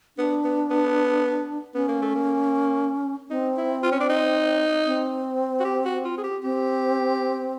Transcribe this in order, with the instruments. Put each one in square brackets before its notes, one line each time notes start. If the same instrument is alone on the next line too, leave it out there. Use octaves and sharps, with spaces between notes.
[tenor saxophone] B3 [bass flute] D4
[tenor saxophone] B3
B3
[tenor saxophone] B3 [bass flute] C#4
[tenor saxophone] A#3
A3
A#3
[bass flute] C4 [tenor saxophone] D#4
[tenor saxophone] E4
F4
C#4
D4
D#4
[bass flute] C4
[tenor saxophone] F#4
G4
F#4
F4
G#4
G4
[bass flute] C4 [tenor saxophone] G4